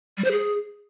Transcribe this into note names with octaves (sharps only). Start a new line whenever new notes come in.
G3
C5
G#4